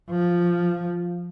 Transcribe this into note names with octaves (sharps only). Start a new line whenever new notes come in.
F3